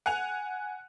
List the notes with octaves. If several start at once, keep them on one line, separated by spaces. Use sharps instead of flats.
F#5 G#5 F#6 F7